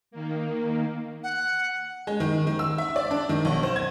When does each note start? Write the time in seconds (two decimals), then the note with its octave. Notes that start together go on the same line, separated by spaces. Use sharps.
0.11 D#3 A#3
1.23 F#5
2.07 G#3
2.20 D#3
2.47 D#3
2.59 E6
2.78 E5
2.96 D5
3.11 D4
3.29 D#3
3.45 B1
3.63 C5
3.76 G#6